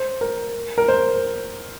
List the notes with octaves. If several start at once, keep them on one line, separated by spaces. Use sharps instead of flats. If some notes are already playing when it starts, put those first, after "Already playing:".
Already playing: C5
A#4
A#4
C5